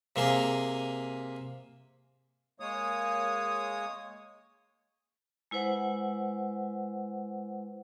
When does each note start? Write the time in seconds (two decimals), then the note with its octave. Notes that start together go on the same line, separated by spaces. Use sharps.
0.16 C3 A#3 G#4
2.60 G#3 A#3 C#5 D#6
5.51 G#3 E4 B4 C5 F#5